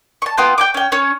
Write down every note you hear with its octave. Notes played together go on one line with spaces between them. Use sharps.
A5 C#6
B3 F4 G5
G5 G#5 D6
C#4 G5
C#4 C#5